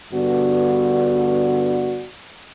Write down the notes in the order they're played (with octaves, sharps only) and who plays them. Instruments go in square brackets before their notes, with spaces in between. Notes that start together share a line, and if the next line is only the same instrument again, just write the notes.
[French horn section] G2 D3 B3 F#4 D5